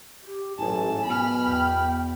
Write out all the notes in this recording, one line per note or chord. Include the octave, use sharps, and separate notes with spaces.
G4
A1 G#2 F#3 G#5 A5
B2 B5 F6
E2 G5